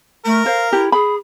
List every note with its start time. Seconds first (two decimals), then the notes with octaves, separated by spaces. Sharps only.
0.25 A3 A#4
0.46 C5 F5
0.73 E4 G4
0.92 G#4 B5